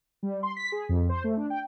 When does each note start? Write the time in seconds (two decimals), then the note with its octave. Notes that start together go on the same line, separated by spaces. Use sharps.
0.23 G3
0.43 C6
0.56 B6
0.72 G#4
0.89 F2
1.09 C5
1.24 A3
1.37 D4
1.50 G5